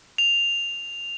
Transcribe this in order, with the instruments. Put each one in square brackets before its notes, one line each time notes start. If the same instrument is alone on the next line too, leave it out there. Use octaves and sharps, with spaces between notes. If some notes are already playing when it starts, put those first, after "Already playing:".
[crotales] F7